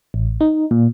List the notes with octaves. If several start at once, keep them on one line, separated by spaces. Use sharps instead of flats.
A1
D#4
A#2